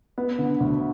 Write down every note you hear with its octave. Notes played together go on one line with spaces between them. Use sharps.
B3
D3
D2